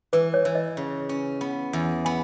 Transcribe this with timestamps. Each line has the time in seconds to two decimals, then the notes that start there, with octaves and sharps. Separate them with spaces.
0.13 E3 B4
0.34 C#5
0.45 E3
0.55 D#5
0.77 C#3
1.09 C#4
1.41 B3
1.73 E2
2.05 B3 G#5